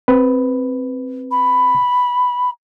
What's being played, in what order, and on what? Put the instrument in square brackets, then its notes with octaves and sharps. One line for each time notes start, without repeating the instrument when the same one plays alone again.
[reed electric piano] C4 B4
[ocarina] B5